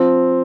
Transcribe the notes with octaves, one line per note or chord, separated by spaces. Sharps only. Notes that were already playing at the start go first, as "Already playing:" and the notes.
Already playing: F3 C4